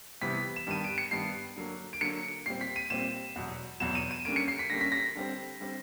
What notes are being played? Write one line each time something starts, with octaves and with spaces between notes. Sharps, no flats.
C3 E3 G3 B3 B6
E7
G2 D#3 G3 B3 D#7
D7
C#7
G2 D#3 G3 B3 C7
D3 F#3 A#3
D7
D3 F#3 A#3 C#7
A#2 G3 C4 C7
B6
D#7
A#2 G3 C4 E7
E2 B2 F#3
E2 B2 F#3 E7
D#7
D#7
D3 G3 A#3 C#4 D7
C#7
C7
B6
D3 G3 A#3 C#4 A#6
B6
A#6
D3 G3 C4
D3 G3 C4